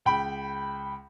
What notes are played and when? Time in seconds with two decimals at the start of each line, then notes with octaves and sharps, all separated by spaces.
0.05 C#2 G5 B5